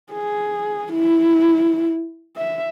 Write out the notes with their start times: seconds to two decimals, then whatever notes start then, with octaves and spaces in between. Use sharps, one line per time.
0.12 G#4
0.93 E4
2.37 E5